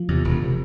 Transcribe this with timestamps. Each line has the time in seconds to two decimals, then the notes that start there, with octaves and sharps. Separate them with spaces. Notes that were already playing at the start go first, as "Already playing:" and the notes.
Already playing: F3
0.08 E2 C3
0.24 E1
0.44 C3